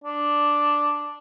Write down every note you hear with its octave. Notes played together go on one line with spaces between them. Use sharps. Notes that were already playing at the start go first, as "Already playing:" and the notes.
D4